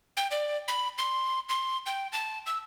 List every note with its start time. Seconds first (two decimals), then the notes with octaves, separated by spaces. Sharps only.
0.17 G5
0.31 D5
0.68 B5
0.98 C6
1.49 C6
1.86 G5
2.12 A5
2.46 E6